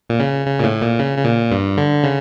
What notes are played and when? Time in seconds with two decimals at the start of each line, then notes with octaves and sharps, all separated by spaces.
0.10 A#2
0.20 C#3
0.46 C#3
0.60 A#2
0.64 A2
0.81 A#2
0.98 C#3
1.18 C#3
1.25 A#2
1.51 G2
1.78 D3
2.03 C#3